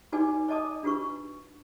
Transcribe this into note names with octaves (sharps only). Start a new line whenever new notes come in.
D#4 F#4 B4 D5 G#5 D6
D5 D#5 A5 D6 D#6
D4 F4 F#4 B4 C#6